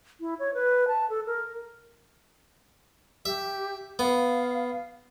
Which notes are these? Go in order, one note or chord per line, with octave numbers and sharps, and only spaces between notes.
E4
C#5
B4
A5
A4
A#4
G4 E5
B3 F5